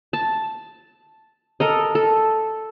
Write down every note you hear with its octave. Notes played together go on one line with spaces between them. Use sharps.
A5
A4 A#4 D#5
A4